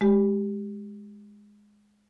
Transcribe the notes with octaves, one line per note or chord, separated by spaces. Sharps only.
G#3 G4